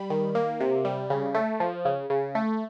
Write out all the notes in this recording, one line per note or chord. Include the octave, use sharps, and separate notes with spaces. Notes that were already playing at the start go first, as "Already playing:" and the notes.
Already playing: G3 B5
D#3
A#3
C3
G3
C#3
A3
F3
C#3
C#3
A3